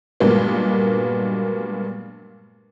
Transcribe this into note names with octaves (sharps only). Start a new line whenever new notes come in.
G2 A#2 F#3 G#3 A#3 B3